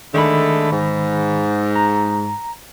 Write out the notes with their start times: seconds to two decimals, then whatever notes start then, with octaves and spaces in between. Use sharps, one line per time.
0.14 D3 D#3 G#3 A3 B5
0.72 G#2
1.76 A#5